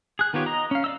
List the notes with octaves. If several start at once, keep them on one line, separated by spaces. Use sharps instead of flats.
G#4 F#6
D#3 B3 F4 G4 C#5
D#5 A#5
C#4 F5
D5 D#5 E6